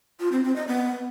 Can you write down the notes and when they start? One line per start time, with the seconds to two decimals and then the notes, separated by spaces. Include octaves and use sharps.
0.20 F4
0.32 C4
0.44 C4
0.56 D#5
0.68 B3